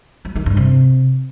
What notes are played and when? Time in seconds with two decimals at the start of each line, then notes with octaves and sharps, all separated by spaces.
0.25 F#3
0.35 D#3
0.46 G2
0.57 C3